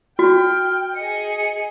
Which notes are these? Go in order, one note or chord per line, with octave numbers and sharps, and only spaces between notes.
F#4 G5 F6
G#4 D#5 C#7